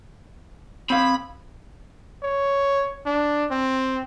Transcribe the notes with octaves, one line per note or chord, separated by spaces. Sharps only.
C4 F5 B5
C#5
D4
C4